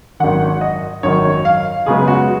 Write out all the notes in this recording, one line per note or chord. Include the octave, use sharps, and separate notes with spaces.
G#1 F#2 D#3 F#5
D#5
G#1 F#2 D#3 C#5
F5
F#2 C#3 G#3 B3 G#4
F#4